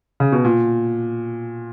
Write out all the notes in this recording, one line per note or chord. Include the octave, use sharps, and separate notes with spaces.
C#3
B2
A#2